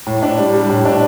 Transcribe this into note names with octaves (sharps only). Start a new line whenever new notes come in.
A2
D4
G3
G3
A2
D4